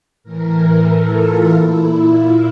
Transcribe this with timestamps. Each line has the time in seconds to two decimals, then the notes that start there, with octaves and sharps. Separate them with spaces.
0.23 A2 E3 A#4
0.86 A4
1.17 F4
1.48 A#2 E4
2.10 F4